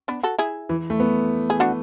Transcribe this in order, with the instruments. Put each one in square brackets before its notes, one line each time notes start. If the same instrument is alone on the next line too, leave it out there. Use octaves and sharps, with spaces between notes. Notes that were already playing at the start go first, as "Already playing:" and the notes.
[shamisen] B3 D4
F#4 A4
E4 G#4
[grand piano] E3
A3
B3
[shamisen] G#4
D4 F#4